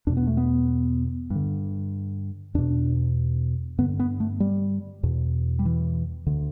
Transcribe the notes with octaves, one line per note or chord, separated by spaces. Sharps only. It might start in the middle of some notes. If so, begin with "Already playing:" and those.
E2 B2 D4
B3
A3
B3
G2 D3
E2 B2 D4
G2 D3 B3
B3
A3
G3
E2 B2
G3
E3
D2 D3